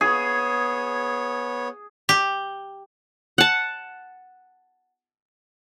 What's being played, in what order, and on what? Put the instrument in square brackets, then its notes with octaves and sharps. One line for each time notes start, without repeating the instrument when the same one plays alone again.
[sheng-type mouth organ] B3 C#5 [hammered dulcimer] G#4
[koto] G4
[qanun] F#5 A5